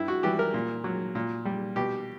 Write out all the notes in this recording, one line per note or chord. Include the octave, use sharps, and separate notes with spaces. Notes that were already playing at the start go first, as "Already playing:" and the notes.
Already playing: G2 E4
F#4
E3 G3 G4
A#4
A#2
F#3
A#2
G3
B2 G4